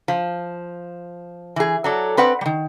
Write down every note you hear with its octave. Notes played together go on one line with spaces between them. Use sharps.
F3
E3 G#4
F#3 A4 D5
C4 B4 D5 F#5
D#3 G3